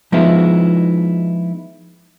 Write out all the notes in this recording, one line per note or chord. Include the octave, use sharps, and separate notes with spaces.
F3 G#3 B3 D#4 E4